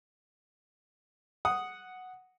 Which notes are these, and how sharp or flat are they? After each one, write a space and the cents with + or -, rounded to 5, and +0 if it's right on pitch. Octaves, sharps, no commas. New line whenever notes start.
F#5 +0 D#6 +0